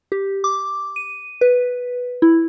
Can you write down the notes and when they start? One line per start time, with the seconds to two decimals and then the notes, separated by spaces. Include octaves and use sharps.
0.12 G4
0.44 D6
0.96 D#7
1.41 B4
2.22 E4